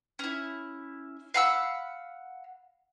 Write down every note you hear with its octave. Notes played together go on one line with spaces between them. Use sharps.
C#4 E4
F5 F#5 B5 E6